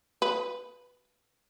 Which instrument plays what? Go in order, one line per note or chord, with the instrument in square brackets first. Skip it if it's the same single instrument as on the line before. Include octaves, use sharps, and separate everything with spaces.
[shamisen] B4